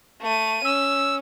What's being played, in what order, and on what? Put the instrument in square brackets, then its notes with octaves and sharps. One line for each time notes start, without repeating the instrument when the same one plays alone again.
[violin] A3 D#7
[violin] C#4 [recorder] E6